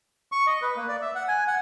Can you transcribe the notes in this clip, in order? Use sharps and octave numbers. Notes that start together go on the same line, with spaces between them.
C#6
D#5
B4
A#3
D5
E5
F#5
G#5
F#5